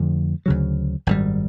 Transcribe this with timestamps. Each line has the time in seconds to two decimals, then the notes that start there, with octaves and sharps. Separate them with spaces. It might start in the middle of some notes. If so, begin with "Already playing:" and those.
Already playing: F2 D3 F3 A3
0.46 D2 C#3 F#3
1.07 G#1 F#2 D3 G3